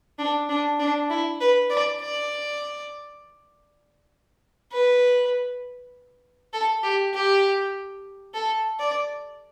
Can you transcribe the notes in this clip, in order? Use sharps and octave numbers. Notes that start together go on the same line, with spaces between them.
D4
D4
D4
E4
B4
D5
D5
B4
A4
G4
G4
A4
D5